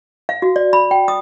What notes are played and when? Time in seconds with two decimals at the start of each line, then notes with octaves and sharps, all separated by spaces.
0.29 F5
0.42 F#4
0.56 D5
0.73 B5
0.91 G5
1.08 D#6